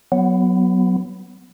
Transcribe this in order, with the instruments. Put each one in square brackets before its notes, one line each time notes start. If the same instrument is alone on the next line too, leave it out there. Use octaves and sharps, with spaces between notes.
[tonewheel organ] F#3 B3